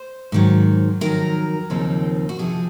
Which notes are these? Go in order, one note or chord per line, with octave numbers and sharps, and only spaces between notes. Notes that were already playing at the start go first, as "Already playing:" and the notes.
Already playing: C5
G#2 D#3 F#3
F2 D#3 F#3 A#4
D#2 C#3 F3 C4 D#4
F#4
F2 C3 F3 G#4